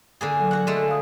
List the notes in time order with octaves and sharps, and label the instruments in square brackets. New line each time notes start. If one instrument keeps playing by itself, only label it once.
[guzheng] D3 A#3 G#4
[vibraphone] F#3 A4
[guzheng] F#4 F#5
[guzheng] D3 G#3 A3 [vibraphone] A4
[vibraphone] F5 D#6